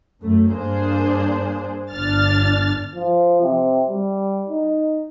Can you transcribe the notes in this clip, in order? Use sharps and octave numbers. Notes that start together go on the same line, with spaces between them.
F#2 A3
G2 A#3 D4 G#4 C5
G1 D4 F6 A6
F3
C3
G3
D#4